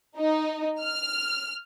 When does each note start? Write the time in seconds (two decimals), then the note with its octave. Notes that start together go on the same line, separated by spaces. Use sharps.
0.18 D#4
0.80 F6